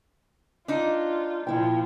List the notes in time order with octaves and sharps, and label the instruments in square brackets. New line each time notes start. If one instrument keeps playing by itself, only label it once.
[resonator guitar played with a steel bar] D4 D#4 [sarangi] F4
[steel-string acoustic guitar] A#2 E4 G5 [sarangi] F3